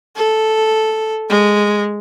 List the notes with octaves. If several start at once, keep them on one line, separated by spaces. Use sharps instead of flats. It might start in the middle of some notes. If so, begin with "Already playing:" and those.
A4
G#3